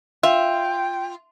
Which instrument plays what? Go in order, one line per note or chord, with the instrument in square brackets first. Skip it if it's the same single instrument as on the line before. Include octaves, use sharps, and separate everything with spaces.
[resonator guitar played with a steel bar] F4 [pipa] E5 [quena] G5